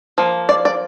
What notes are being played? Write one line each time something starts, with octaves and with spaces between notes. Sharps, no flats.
F3 A#3
D5
D5